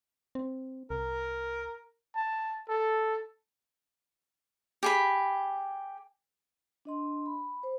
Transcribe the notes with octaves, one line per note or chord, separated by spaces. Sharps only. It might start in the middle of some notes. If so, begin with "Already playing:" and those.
C4
C2 A#4
A5
A4
G4 G#4 B5
D4 D#5 C6
B5
C5